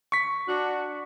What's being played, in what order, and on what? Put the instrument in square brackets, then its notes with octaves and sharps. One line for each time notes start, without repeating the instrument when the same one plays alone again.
[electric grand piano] C#6 B6
[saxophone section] D4 F#4